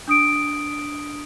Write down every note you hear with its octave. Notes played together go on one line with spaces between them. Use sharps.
D4 D#6 D7